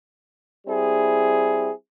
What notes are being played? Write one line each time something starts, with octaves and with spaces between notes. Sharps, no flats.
G3 C4 E4 G#4